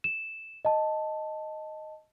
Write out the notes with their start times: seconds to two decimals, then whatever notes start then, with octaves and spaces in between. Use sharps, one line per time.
0.04 E7
0.65 D#5 A5